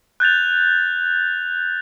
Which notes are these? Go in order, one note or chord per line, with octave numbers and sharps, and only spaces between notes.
F#6 G6 A6 F7